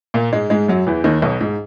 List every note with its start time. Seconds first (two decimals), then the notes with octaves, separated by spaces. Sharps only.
0.14 A#2 A#3
0.33 G#2 G#3
0.50 G#2 G#3
0.68 F#2 F#3
0.87 E2 E3
1.04 D#2 D#3
1.22 B1 B2
1.41 G#2